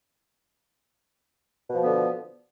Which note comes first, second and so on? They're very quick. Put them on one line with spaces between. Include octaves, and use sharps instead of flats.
B2 F3 B3 D3